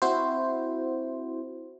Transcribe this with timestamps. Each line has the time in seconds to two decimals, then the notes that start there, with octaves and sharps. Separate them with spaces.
0.02 C4 E4 F#4 C5